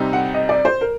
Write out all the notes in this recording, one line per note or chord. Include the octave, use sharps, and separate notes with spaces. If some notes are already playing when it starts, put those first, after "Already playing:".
Already playing: C3 G3 C4 D#4
F#5
D#5
D5
C5
A#4